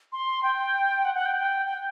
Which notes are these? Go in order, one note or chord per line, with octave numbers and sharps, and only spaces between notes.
C6
G5
F#5
F#5
G5
G5
G5